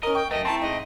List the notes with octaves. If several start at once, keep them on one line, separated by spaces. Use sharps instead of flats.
C#4 A#4 D#5 A#5
G5 C#6
F#2 A3 A#4 D#5 G5
A3 C4 E4 A5 A#5 C6
G#2 D#4 D#5